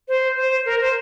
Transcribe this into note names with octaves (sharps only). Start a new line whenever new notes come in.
C5
C5
A#4
C5